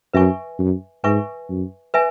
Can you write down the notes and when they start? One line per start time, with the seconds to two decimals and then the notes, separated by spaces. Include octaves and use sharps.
0.14 F#2 B4 E5 G#5 C#6
0.59 F#2
1.04 G#2 B4 E5 G#5 C#6
1.49 F#2
1.94 B4 E5 G#5